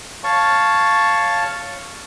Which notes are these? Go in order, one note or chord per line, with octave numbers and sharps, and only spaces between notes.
C#5 F5 A5 C#6